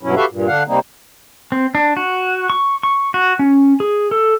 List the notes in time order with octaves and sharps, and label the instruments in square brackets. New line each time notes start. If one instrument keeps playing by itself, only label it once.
[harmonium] G2 B2 F#3 C#4 E4
F#4 G4 A4 B4 E5 F5
G2 A#2
D3 D4 F5 F#5
C3 G3 A#3 C4 D#4
[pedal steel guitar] C4
D4
F#4
C#6
C#6
F#4
C#4
G#4
A4